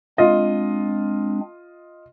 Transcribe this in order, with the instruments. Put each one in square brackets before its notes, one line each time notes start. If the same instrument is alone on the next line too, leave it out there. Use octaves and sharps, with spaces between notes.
[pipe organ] G#3 C4 D4 [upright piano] F4 D#5